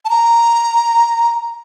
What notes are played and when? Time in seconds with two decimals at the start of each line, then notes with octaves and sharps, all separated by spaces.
0.05 A5
0.10 A#5